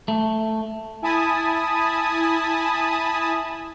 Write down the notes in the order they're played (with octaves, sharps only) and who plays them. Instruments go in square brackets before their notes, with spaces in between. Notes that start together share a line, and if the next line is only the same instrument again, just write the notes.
[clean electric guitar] A3
[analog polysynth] E4 G#5 A5 B5 D#6